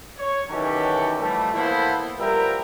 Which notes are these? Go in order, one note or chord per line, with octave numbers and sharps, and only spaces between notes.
C#5
D#3 E3 F#3 C#4 G4 A4
E3 F3 G3 A3
E3 A#3 B3 E4 A4 C5
F3 G3 B3 A#4 E5 G5